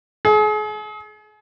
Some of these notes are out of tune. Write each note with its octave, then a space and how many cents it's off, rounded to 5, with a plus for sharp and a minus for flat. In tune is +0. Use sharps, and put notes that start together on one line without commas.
G#4 +35